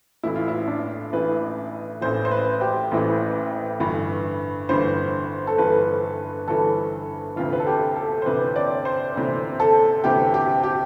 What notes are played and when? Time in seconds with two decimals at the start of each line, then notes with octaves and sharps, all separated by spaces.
0.23 A1 A2 E3 E4
0.36 F4
0.48 E4
0.68 D4
1.12 A1 A2 E3 B4
2.01 A1 A2 E3 C5
2.25 C5
2.31 B4
2.61 G4
2.92 A1 A2 E3
3.80 G1 G2 E3
4.69 G1 G2 E3 C5
5.47 A4
5.58 G1 G2 E3 B4
6.48 G1 G2 E3 A4
7.36 D2 C3 E3 F4
7.53 B4
7.60 A4
7.67 G4
7.96 A4
8.22 C5
8.26 D2 C3 E3 B4
8.56 D5
8.85 C5
9.15 D2 C3 E3
9.60 A4
10.04 D2 C3 E3 G4
10.34 G4
10.63 G4